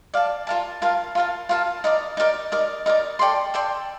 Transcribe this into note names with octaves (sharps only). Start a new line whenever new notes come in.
D5 F5 A5
F4 A#4 F5 A5
F4 A#4 F5 A5
F4 A#4 F5 A5
F4 A#4 F5 A5
D#4 A#4 D5
D#4 A#4 D5
D#4 A#4 D5
D#4 A#4 D5
A4 D5 G5 C6
A4 D5 G5 C6